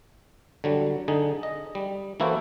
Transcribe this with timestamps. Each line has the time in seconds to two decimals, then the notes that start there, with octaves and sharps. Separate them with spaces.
0.64 D3 F#3 G3
1.08 D3 D#4 G#4
1.43 D#5
1.75 G3
2.20 E3 A#3 E4 F#4 A4 C5